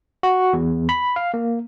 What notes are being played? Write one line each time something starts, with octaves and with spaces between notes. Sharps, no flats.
F#4
E2
B5
F5
A#3